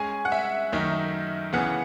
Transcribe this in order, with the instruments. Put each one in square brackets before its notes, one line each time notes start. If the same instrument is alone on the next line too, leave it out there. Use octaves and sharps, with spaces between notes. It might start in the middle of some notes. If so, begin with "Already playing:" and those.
Already playing: [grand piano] G#3 C#4 G#4 [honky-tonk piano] G#5
[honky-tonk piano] F#5
E5
[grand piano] F#2 D#3 A3 D#4 [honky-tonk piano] E5
[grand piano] C#3 E3 B3 [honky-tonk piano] F#5